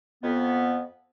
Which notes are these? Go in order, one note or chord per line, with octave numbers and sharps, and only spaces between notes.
F2 B3